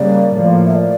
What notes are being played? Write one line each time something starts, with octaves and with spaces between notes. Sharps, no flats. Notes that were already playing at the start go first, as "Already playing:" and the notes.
Already playing: C#3 G3 A#3 D5
A2 F3 A#3
E5
D5